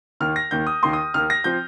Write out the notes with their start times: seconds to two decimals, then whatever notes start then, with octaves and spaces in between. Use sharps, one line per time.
0.20 D#2 D#3 A#3 F6
0.36 A#6
0.51 D#2 D#3 A#3 G6
0.67 D#6
0.83 D#2 D#3 A#3 C6
0.93 D#6
1.14 D#2 D#3 A#3 F6
1.30 A#6
1.44 F3 C4 G6